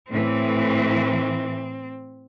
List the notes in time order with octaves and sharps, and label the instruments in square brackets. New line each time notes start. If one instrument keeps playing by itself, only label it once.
[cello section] A2 E3 [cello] C4